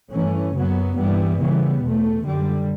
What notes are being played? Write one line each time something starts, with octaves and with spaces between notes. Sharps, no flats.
G2 E3 A3 C#4
F#2 C#3 F#3 B3
G2 E3 G3 B3
C#3 E3 G3 B3
E2 B2 A3
F#2 D3 G3